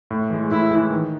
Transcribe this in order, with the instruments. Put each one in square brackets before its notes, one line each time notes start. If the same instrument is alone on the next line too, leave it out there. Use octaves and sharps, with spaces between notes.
[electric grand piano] A2
E3 G#3
[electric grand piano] A2 [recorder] E4
[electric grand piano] E3 G#3
D#3